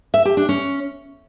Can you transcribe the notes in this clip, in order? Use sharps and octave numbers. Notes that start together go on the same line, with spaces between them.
E5
G4
D4
C#4